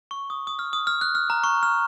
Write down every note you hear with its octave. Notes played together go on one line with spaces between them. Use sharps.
C#6
D#6
D#6
F6
D#6
F6
F#6
F6
A#5
C#6
F6